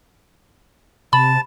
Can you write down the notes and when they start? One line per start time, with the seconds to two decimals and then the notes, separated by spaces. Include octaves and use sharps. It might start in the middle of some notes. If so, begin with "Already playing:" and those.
1.13 C3 A5 B5